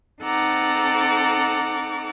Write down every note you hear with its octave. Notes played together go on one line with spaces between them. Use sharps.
C4 D#4 A4 F#5 A#5 D6